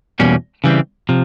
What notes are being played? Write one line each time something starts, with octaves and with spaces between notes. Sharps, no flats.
E2 B2 G3 A#3 C#4
C#3 E3 G3 C4
C3 F3